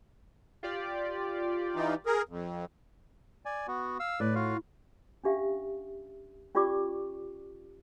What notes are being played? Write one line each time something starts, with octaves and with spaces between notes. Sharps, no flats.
F4 G4 D5
E3 D#4
G#4 A#4
F2
D5 G#5
B3 F#4
F5 E6
A2 B4 D5
F4 F#4 F5
C#4 D4 G4 E5 F5
C#4 F4 G4 D5 C#6 D6